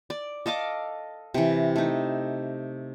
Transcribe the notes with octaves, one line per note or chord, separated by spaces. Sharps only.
D5
A4 D#5 F5 D6
C3 E3
A3 D#4